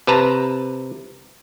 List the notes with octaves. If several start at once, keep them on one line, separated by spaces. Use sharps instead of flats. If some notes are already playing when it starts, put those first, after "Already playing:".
C3 B4 A5 A#5